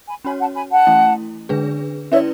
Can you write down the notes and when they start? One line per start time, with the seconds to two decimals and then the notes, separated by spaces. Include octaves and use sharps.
0.09 G#5 B5
0.24 C#4 F#4 C#5 G#5 B5
0.40 F#5 A5
0.55 G#5 B5
0.71 F#5 A5
0.87 E3 A3 C#4 E4
1.49 D3 G#3 D4 G#4 B4
2.12 C#4 E4 B4 C#5 D5 E5